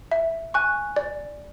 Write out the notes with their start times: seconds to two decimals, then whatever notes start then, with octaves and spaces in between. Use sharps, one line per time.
0.12 E5
0.54 G#5 C#6 F#6
0.96 D5